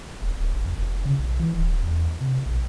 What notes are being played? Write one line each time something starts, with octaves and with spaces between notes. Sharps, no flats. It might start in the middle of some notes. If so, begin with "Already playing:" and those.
E1
D1
G1
F2
F1
C#3
B1
E3
D1
E2
C3
A#1